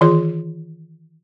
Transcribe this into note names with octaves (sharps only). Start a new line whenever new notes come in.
D#3 E3 F4 G#4 C6